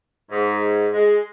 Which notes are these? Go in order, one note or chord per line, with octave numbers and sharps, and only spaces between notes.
G#2
G#3